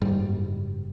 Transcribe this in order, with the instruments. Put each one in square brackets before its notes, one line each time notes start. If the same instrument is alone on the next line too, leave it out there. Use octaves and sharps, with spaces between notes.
[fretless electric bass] F#1 G#2 G3